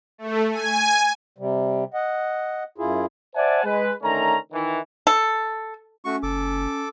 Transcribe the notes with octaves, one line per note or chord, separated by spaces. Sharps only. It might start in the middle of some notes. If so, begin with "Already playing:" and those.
A3
G#5
C3 G3
D#5 F#5
F#2 E4 F4 G#4
C5 D5 E5 F#5 G#5 A5
G#3 B4
D3 D#3 A3 C#4 A#5
D#3 E3
A4
A3 C#4 F#4 C#6
F#1 A4 D6